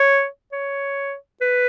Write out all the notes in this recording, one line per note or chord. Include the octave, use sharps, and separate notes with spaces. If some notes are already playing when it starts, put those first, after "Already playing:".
Already playing: C#5
C#5
B4